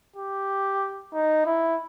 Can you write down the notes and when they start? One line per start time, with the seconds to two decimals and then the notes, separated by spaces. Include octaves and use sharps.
0.16 G4
1.13 D#4
1.46 E4